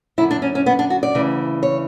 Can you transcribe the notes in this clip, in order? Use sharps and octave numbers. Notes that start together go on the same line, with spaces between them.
F#2 D3 E4
D4
C#4
C#4
B3
D4
F#4
D5
D2 C#3 E3
C#5